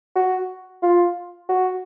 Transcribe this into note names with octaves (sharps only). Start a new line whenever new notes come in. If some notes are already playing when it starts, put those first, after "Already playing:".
F#4
F4
F#4